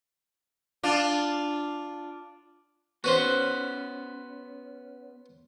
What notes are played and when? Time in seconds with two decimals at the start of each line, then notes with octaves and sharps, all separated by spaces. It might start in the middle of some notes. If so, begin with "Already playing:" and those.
0.83 D4 F4
3.04 B3 C#4 F#4 B4 C5